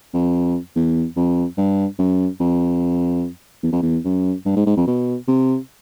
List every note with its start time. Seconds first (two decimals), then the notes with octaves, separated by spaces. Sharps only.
0.14 F2
0.76 E2
1.16 F2
1.57 G2
1.99 F#2
2.40 F2
3.63 E2
3.72 F2
3.82 E2
4.05 F#2
4.46 G2
4.56 G#2
4.66 G#2
4.76 F2
4.87 B2
5.28 C3